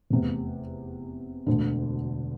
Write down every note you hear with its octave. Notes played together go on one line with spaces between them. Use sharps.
F1 E2 C3
E1 D2 D3